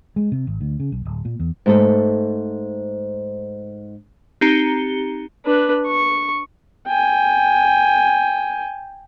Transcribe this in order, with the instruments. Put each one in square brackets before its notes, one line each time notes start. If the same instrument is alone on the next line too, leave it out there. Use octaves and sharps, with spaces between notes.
[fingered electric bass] G#3
C3
G#1
D2
C#3
B1
D1
A#2
E2
[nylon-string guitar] G#2 A3 A4
[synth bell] C4 D#4 G4 A#5 C#7 G7
[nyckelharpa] D4 B4
C#6
G5 G#5